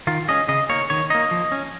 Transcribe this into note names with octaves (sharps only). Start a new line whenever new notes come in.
D#3 F4
G#3 C#4 D#5
C#3 D#5
A#3 D#4 C#5
D#3 C#5
A#3 D#4 D#5
F3
C#4